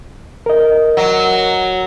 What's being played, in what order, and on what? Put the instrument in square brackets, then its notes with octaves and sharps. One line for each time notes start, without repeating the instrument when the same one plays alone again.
[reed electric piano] A#4 D#5
[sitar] F#3